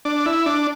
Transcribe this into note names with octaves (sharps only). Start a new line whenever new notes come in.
D4
E4
D4